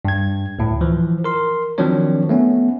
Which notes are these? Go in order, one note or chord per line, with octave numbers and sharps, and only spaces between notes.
G2 G#6
D2 A2
E3 F3
A#4 C6
D#3 F3 F#3 C4 D4 C#5
A3 B3 C#4